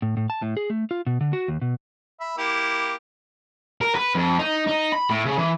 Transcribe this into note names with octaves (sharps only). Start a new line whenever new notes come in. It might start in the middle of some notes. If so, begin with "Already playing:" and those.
A2
A2
A5
A2
G#4
A3
F4
B2
D3
F#4
D#2
B2
E5 B5
A#3 E4 G4
A#4
B4
F2
D#4
D#4
B5
A2
C#3
E3